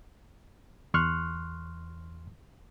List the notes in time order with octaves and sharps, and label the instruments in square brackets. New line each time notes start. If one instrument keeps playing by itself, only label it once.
[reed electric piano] E2 C6 C#6 F6 F#6